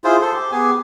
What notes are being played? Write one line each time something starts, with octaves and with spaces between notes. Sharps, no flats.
E4 F4 G#4 C5
A4 C5
G4 C5
B3 G4 G#4 G#5